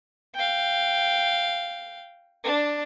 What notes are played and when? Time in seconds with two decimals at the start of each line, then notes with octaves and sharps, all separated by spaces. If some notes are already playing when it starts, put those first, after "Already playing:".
0.34 F5 G5
2.44 D4